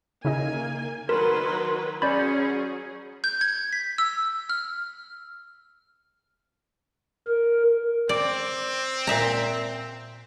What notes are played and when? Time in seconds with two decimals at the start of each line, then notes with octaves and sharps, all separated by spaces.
0.25 C#3 A#3 D#4 D#5 G#5
1.09 D#3 F#3 A#4 B4 C6
2.02 F#3 C#4 G#4 D5 B5 G6
3.24 G6
3.41 G#6
3.73 B6
3.98 E6
4.50 F6
7.28 A#4
8.09 C4 D5
9.07 A#2 E5 A#5